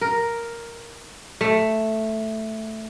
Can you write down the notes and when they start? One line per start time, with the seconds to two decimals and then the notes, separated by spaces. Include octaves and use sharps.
0.01 A#4
1.41 A3